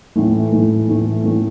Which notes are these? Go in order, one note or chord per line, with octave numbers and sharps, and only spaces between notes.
A2 E3 A3
A2 E3 A3
A2 E3 A3
A2 E3 A3